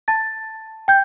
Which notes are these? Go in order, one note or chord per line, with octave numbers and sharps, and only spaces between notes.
A5 A6
G5 G6